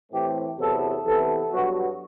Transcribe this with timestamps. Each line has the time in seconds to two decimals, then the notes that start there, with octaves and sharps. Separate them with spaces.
0.11 A2 E3 A3 C4 G4
0.58 E2 C3 F#3 B3 A4
1.04 C3 E3 B3 A4
1.51 G2 F#3 B3 F#4